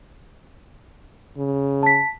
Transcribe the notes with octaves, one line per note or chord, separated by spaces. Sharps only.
C#3
A5 B6